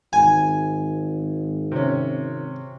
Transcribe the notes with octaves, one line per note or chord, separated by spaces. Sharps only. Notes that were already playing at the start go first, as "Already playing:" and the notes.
G#1 G#5
C3 C#4